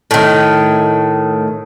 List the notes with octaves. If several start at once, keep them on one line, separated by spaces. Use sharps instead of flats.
A2 D#3